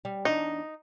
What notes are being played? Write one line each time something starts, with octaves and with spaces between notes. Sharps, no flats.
G3
E2 D4 D#4